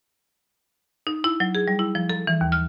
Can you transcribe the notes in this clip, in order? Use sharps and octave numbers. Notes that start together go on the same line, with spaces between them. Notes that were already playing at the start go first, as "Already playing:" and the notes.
D#4
E4
F#3
G#4
G3
E4
F3
A4
E3
D#2
F6